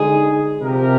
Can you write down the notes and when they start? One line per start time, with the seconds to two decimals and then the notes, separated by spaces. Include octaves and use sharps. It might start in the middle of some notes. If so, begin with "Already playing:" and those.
Already playing: D3 G#3 D#4 G#4
0.61 C3 F3 C4 G4 A#4